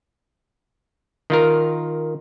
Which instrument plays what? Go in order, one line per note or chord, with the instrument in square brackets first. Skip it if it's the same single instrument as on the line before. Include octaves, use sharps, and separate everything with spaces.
[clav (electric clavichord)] D#3 F4 A#4